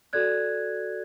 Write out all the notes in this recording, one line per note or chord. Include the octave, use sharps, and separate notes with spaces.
F#4 A4 D5 F#6 G#6